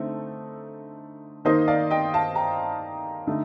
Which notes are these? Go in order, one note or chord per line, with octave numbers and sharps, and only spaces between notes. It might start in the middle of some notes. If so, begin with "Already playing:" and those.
Already playing: D3 A3 C4 D#4 A4
D#3 A#3 D#4 C5 D#5
D5 F5
D#5 G5
F5 A5
G5 A#5
D3 A3 D#4